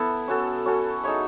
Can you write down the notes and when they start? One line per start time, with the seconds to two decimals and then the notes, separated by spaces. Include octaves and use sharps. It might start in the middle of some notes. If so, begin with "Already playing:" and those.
Already playing: B3 E4 A4
0.28 C#4 F#4 A4
0.66 C#4 F#4 A4
1.04 D#4 G#4 C#5 E5